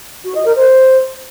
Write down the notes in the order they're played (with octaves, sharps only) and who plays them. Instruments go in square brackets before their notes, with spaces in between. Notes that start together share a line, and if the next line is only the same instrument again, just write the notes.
[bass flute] F#4
D#5
A#4
C5